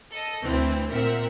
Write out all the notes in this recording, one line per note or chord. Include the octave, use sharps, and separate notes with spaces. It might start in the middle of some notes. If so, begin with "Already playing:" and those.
A4 D#5
D2 E3 C4
A#2 C4 A#4 E5 F#5